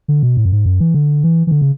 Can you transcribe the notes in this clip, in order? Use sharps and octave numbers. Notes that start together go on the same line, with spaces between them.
D3
B2
A2
F#2
G#2
F#2
E3
D3
E3
E3
D3
C#3